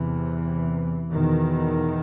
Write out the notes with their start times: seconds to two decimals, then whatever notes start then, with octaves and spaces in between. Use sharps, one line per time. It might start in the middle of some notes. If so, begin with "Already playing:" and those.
Already playing: E2 C3 E3
1.13 E2 B2 D#3